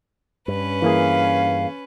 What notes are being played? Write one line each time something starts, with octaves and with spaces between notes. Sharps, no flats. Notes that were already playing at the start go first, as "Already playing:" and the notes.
G2 C#4 B4
E3 A#3 G#4 F5